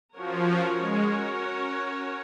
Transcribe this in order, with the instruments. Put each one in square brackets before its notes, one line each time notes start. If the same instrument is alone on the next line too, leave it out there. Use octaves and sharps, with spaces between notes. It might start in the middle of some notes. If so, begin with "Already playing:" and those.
[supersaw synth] F3 [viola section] C#4 F#4 A#4 C#5
[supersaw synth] G#3